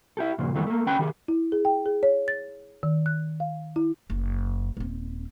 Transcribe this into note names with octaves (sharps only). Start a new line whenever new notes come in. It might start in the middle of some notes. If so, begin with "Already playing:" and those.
E4 G4 A4
G2 A#2 C#3 F3
F2 D#3 E3 G3 A3 B3
A3 A#3
D2 C#4 B4 G5 G#5 B5
D#3 G4 G#4
E4
G#4
G5
G#4
C#5
A6
D#3
F#6
F5
E4
F#1
D#1 C4